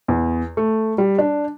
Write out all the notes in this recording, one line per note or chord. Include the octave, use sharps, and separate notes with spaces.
E2
A3
G3
D4